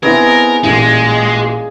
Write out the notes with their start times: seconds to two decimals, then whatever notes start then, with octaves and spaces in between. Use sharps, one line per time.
0.03 B3 C4 E4 G#4 A#4 D#5
0.63 A1 A#2 G#3